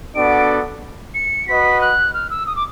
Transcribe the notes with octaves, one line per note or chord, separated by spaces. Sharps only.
B3 D4 F#4 A4 D5 D7
C#7
F#4 B4 D#5 B6
F#6
F6
E6
D#6
D6